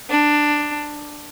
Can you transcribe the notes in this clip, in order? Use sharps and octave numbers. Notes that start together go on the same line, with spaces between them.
D4